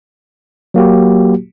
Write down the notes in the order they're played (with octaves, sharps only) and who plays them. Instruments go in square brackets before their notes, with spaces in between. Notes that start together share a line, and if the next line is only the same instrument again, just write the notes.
[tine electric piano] F#3 A#3 F#4 G4